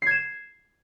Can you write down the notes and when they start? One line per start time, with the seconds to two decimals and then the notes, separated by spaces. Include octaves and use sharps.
0.02 C7
0.07 G#6
0.11 E7